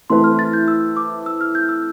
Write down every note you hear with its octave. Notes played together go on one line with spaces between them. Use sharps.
E3 A3 C4 E4 B4 C6
F6
A6
G6
E6
D6
E6
F6
G6
E6